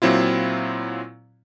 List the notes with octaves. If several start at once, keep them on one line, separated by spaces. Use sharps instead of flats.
A#2 F#3 C4 E4 F4